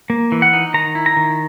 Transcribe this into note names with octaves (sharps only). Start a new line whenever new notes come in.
A#3
E3
F#5
D#4
D#3 A#5
E4
A#5
D#3